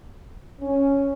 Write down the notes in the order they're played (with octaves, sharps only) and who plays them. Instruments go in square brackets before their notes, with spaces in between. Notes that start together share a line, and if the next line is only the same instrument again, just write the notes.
[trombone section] C#4